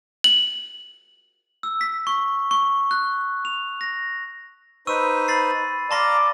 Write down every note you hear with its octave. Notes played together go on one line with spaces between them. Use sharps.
F#7
E6
B6
C#6
C#6
F#6
F7
A#6
D#4 B4 C5 C#6 E6 D#7
B5 A6 C7
D5 F5 A5 A#5 C6 A#6